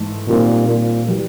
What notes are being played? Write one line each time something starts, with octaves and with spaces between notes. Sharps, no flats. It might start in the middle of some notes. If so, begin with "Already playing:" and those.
Already playing: G#2 E3 A3
A#2 D#3 G3 C4
A#2
E3 G3